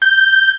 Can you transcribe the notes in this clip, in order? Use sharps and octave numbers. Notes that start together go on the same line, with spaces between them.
G6